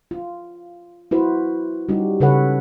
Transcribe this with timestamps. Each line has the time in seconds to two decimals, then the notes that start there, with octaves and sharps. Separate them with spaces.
0.11 F4
1.11 E4 F#4 B4 C5
1.89 G3 C#4 D#4 F#4 G4
2.20 C#3 A4 B4 C#5 F#5